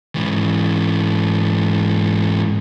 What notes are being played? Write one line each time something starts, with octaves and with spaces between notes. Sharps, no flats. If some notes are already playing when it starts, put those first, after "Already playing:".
G#2 E3